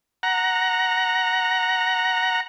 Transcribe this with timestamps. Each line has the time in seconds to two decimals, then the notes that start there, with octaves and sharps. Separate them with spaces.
0.23 F#5 A#5